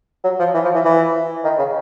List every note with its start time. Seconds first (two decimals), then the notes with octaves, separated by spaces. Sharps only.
0.24 F#3
0.39 F3
0.54 E3
0.64 F3
0.75 E3
0.85 E3
1.44 D#3
1.59 C#3